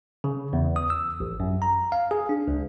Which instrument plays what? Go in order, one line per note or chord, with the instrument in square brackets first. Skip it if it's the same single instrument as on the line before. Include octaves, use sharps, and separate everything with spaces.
[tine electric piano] C#3
E2
D#6
E6
A1
F#2
A#5
F5
G#4
D4
C#2